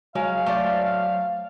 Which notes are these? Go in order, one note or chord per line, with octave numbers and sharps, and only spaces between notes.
F#3 G#3 F5
A3 C5 D5